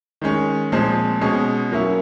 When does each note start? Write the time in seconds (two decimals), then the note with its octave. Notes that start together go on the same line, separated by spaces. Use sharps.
0.22 D#3 G#3 C#4
0.72 A#2 F3 G#3 C4
1.21 B2 G#3 C#4
1.72 F#3 A#3 C#4 E4